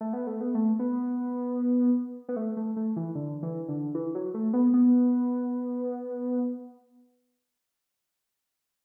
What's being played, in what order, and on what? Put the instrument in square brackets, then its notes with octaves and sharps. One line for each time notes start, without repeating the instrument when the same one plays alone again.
[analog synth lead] A3
B3
A3
B3
A3
B3
B3
A3
A3
A3
E3
D3
E3
D3
E3
F#3
A3
B3
B3